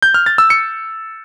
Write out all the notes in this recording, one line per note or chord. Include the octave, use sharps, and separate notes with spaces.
G6
F6
A6
E6
C#7